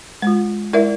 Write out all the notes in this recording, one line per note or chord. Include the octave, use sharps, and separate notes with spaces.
G#3 F4
G#3 E4 A#4 D5 E5